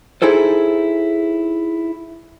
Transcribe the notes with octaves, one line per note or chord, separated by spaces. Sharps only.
D#4 E4 G#4 A4 C5